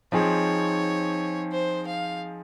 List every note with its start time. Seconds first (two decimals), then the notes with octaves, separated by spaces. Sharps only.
0.12 F3 C4 D#4 G#4 C#5
1.52 C5
1.87 F5